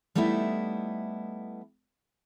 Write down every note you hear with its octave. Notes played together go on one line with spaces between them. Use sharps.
G3 A3 B3 D#4 E4